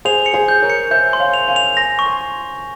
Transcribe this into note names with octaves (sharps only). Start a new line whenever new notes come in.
G#4 C5 F7
C#7
G#4 C5
G6
A#4 C#5
C#7
C5 E5 G6
C6
C#5 F5
F7
F5 G#5
F7
G#5 C6 A#6
C#6
G#5 C6